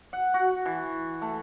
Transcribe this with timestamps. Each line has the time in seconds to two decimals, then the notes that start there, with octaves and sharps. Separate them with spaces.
0.13 F#5
0.34 F#4
0.66 E3
1.22 A3